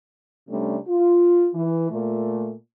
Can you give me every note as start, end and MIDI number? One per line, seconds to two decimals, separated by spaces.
0.48 0.77 48
0.48 0.77 55
0.48 0.77 57
0.48 0.77 61
0.48 0.77 62
0.88 1.49 65
1.55 1.90 52
1.91 2.53 46
1.91 2.53 57